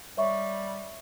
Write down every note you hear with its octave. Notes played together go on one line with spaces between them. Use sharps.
G3 C#5 E5 C#6